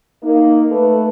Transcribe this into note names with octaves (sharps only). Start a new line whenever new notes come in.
A#3 D#4
A3 A4 B4